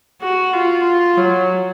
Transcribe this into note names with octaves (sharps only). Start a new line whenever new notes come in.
F#4
F4
F4
F#3